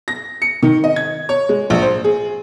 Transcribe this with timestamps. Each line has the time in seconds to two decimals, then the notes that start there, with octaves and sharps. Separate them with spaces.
0.08 A#6
0.42 C#7
0.62 D#3
0.84 D#5
0.96 G#6
1.29 C#5
1.49 G#3
1.70 A#1
1.82 C5
2.04 G#4